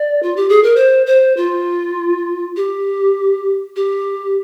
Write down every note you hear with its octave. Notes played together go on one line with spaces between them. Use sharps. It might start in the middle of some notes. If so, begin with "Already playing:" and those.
Already playing: D5
F4
G4
G#4
A#4
C5
C5
F4
G4
G4